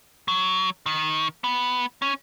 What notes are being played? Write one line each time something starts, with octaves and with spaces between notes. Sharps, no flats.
F#3
D#3
B3
C#4